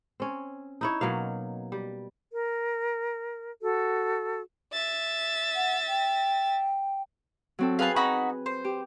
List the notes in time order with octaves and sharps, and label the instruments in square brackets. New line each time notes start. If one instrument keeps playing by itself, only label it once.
[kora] C4 C#4
D#4 E4 C#5
B2 F#3 A#3 F5
G3
[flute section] A#4
F#4 A4
[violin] E5 A6
[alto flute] F#5
G5
[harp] F#3 C4 A4
[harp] G#4 B4 G#5 [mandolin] F5 A5
[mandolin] D#4 F#4 B5
C5
[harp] G4